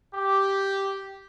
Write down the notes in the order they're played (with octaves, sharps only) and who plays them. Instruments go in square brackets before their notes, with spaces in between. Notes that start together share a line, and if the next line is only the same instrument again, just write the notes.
[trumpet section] G4